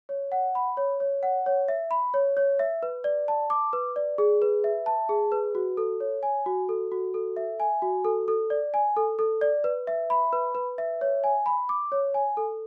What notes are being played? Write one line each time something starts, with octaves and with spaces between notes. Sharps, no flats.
C#5
F#5
B5
C#5
C#5
F#5
C#5
E5
B5
C#5
C#5
E5
B4
D5
A5
D6
B4
D5
G#4
B4
E5
A5
G#4
B4
F#4
A4
C#5
G#5
F#4
A4
F#4
A4
E5
G#5
F#4
A4
A4
D5
G#5
A4
A4
D5
B4
E5
B5
B4
B4
E5
C#5
G#5
B5
D6
C#5
G#5
A4